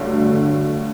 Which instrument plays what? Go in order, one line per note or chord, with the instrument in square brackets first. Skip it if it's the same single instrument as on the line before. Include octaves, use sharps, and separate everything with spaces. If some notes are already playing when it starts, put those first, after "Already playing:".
Already playing: [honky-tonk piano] G2 D3 F#3 A3